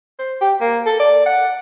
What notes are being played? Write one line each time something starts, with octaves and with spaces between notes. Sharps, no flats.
C5
G4
A#3
A4
D5
F#5